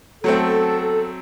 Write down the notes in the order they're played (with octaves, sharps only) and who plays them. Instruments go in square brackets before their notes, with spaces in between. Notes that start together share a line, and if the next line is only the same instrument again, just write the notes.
[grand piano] F#3 A3 C4 [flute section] A4